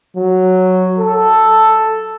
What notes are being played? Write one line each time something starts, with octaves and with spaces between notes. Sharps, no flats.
F#3
A4